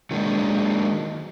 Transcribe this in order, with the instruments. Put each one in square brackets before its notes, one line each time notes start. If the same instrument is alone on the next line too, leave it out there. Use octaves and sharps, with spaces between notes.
[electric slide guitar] D#3 F#3 G#3 A#3 D4 D#4